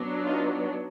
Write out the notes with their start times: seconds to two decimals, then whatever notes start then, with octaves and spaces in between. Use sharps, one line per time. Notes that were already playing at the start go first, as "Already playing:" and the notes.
Already playing: F#3 B3 D4
0.25 D#4 F4